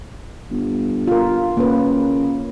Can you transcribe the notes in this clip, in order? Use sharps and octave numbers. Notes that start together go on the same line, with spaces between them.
G1
F4 A#4
C#3 A#3 B4